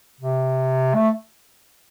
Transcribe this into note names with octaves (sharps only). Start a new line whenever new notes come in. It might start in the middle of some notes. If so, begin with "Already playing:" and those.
C3
A3